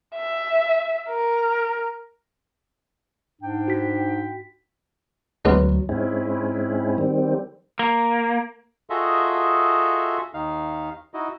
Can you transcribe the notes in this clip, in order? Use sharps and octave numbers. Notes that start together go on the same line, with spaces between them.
E5
A#4
G#2 D4 G5
F#4 B6
D2 F#3 G#3 B3 C#4
G#2 G#3 C4 C#4 E4
D#3 G3 C4
A#3
F4 F#4 G#4 A4 D#5 E5
D#2 D#3 D#4 F5
D#4 E4 F#4 D#5